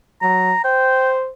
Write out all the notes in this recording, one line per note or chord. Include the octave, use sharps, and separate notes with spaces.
F#3 A#5
C5 G5